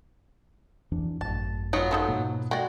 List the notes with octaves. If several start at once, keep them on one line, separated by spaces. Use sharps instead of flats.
F2 E3 D4
G#1 F#2 A2 A5
F#3 B3 D#4 F4
F3 D#4 A4
G#2 B2 A#3
G#3 F#4 D5 G5